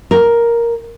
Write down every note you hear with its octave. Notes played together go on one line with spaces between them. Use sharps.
A#4